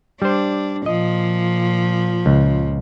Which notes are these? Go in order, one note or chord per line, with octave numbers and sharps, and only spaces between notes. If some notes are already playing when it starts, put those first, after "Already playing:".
G3 D4 C5
A#2 F3 D#5
C#2